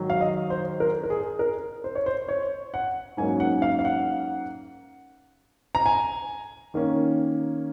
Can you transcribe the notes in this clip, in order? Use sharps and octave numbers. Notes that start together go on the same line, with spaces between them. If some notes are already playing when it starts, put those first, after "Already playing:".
Already playing: G#2 D#3 F#3
F5
D#5
C5
A#4
A#4
G#4
A#4
C5
C#5
C5
C#5
F#5
G#2 F#3 A#3 C#4 G#5
F#5
F5
F5
F#5
A#5
G#5
D#3 A#3 C#4